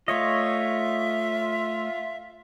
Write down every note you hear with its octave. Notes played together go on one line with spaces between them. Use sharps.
A3 F4 C#5 D#5 E5